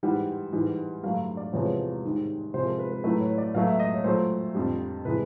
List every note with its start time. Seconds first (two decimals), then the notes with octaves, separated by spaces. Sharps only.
0.03 G#2 E3 G3 F#5
0.53 G#2 E3 G3
1.03 G2 D3 F#3 A3 F5
1.37 D5
1.53 E2 C3 F3 G#3 C#5
2.04 G#2 D#3 G3
2.54 C3 F3 G#3 C5
2.67 A#4
2.79 B4
2.92 B4
3.04 A2 F#3 A3 B4
3.21 C#5
3.38 D5
3.54 B2 F#3 A3 F5
3.68 E5
3.79 D#5
3.94 C#5
4.04 A#2 F#3 A3 C5
4.55 F2 D3 G3
5.05 C3 E3 G#3 B4